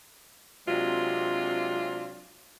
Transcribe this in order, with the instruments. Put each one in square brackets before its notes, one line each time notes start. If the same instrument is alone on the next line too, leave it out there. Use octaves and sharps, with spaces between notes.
[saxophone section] C3 F#3 G#3 C4 D4 F4